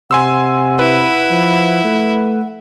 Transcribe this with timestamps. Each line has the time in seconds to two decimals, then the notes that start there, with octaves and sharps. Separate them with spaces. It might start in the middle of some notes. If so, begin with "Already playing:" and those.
0.11 C3 F#5 G#5 C6 E6
0.79 E4 B4
1.31 F3
1.84 A3